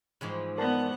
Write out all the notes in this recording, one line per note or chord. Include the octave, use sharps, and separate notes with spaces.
G#2 E3 F3
B3 A#4 D5 F#5 A5